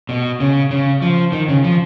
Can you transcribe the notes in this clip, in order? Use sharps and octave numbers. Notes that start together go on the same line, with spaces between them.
B2
C#3
C#3
F3
D#3
C#3
F3